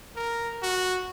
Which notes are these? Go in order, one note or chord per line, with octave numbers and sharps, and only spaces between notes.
A#4
F#4